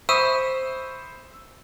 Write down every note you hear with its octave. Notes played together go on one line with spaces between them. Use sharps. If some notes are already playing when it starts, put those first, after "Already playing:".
C5 E5 B5 C#6 D#6 E6 D#7